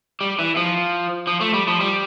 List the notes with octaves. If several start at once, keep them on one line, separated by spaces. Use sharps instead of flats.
G3
E3
F3
F3
A3
G3
F3
G3